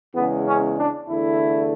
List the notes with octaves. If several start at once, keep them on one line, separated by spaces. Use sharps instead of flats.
E2 C#3 G#3 B3
C#4
D4
E2 D3 A3 E4